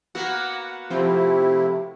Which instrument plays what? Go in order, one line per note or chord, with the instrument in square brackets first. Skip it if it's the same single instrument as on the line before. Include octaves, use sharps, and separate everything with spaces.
[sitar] A#3 B3 F#4 [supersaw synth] F#5
[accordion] C3 A3 E4 [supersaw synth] F3 C4 [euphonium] G4